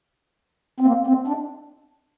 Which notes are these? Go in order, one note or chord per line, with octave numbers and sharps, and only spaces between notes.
C4
A#3
C4
D4